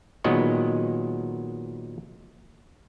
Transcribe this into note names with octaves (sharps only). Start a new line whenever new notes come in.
A#2 D#3 F#3 G#3 B3 D#4